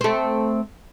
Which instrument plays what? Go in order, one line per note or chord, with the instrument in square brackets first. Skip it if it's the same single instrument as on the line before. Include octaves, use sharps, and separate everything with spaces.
[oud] A3 C4